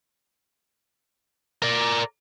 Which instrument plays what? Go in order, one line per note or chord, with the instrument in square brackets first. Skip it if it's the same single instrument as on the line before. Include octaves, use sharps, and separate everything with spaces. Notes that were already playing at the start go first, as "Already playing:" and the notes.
[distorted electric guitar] A#4 D5